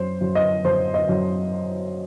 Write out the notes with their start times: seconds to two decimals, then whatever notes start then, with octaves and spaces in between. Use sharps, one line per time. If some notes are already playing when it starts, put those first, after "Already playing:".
Already playing: F#2 C5
0.21 F#2
0.35 D#5
0.64 F#2 C5
0.94 D#5
1.09 F#2